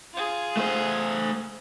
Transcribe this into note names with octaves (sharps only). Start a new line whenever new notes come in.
F4 G#4
A3 C5